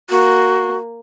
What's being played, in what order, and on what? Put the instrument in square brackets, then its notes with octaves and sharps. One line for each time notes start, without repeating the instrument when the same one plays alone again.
[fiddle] A#3 [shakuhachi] F#4